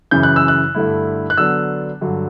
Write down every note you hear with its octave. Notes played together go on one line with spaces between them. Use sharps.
F#2 C#3 E3 G6
F#6
E6
F#6
G2 D3 A3 E4
F#6
D3 F#3 B3 D4 E6
G2 D3 F#3